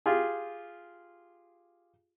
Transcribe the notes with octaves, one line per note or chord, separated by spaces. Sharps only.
F4 G4 G#4